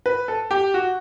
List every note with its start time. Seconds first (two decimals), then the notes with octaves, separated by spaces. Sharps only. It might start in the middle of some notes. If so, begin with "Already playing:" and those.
0.06 B4
0.28 A4
0.51 G4
0.74 F#4